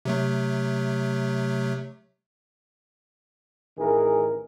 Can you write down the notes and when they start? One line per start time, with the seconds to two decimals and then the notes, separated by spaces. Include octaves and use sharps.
0.05 C3 F#3 A3
3.78 A1 D#3 E3 G#4 A#4